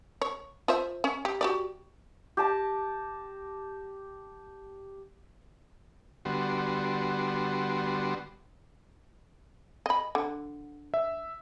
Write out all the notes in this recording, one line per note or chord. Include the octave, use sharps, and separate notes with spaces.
C#5
F4 C5 E5
C#4
G4
F#4 G4 D5
G4 A5 A#5
D3 G3 B3 F#4 C6
D#5 B5
D3
E5